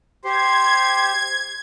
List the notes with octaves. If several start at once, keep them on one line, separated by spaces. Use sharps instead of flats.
G4 C5 C6 G#6